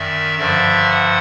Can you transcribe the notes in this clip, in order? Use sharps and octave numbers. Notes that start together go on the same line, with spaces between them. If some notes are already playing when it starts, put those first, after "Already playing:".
Already playing: F#2 D#3 D5 E5
G2 D3 F3 D5 E5
F#5